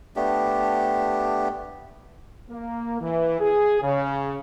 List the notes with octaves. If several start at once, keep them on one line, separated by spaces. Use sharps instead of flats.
A3 B3 D4 G4
A#3
E3
G#4
C#3